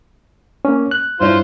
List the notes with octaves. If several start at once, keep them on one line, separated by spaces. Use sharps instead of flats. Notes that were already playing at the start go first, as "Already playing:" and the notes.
A#3 C#4
F#6
G2 E4 F4 C5 C#5